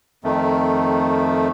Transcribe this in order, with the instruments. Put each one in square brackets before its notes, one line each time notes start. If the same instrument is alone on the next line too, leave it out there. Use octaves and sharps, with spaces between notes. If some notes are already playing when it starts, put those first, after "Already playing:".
[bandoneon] F2 D#3 A3